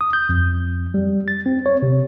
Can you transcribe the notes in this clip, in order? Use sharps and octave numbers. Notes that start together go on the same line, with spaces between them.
D#6
G6
F2
G3
A6
C4
C#5
C3